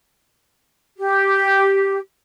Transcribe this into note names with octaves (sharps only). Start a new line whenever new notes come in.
G4